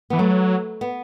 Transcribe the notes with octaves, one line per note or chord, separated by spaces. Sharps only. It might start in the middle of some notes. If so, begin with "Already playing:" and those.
E3 B3
F#3 A3
B3